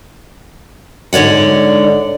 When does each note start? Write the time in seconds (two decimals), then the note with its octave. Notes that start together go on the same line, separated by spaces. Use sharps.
1.13 G#2 D3 C#5 D5 F#5